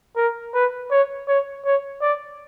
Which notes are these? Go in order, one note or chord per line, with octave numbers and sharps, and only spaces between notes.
A#4
B4
C#5
C#5
C#5
D5